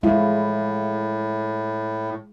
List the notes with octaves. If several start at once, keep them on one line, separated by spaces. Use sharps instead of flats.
A2 G#3 E4 F4